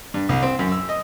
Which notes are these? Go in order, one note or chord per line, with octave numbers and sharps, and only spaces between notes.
G2
C2
C4
F#2
E6
D#5